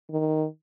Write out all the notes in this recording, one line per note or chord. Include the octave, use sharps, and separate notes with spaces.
D#3